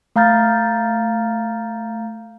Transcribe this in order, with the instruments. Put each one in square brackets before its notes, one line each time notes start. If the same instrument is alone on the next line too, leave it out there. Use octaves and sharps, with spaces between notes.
[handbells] A3 F5 A#5 F6 G6 A6